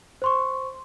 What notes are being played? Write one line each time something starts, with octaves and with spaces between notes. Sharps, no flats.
C5 C6 C#6